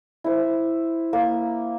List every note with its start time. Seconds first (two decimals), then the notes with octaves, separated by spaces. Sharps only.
0.24 E4 C5
1.13 A#3